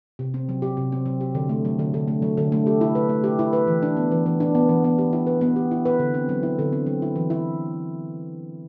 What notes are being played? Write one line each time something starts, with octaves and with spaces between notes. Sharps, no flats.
C3
C4
F#3
G4
C3
C4
F#3
G4
D3
A3
F#3
D3
D3
A3
F#3
D3
A3
G4
E4
B4
A3
G4
E4
B4
E3
D4
B3
E3
E3
D4
B3
E3
B3
G4
E4
B4
B3
G4
E4
B4
D3
C4
F#3
E4
D3
C4
F#3
E4
E3
E4